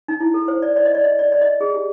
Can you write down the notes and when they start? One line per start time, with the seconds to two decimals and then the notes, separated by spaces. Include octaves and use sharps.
0.08 D#4
0.20 E4
0.34 A4
0.48 C5
0.62 D5
0.76 D5
0.86 D#5
0.95 D5
1.04 D#5
1.19 D5
1.32 D5
1.41 D#5
1.61 G#4
1.74 G4